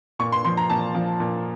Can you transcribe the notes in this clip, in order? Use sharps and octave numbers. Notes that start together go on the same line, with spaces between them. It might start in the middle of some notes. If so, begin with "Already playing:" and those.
A#2 C#6
C6
F3 C6
A#5
A#2 A5
F3
A#2